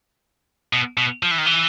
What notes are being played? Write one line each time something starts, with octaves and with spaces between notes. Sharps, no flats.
B2
B2
F3
E3
D#3
E3